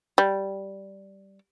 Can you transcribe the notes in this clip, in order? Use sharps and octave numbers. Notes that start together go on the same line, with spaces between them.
G3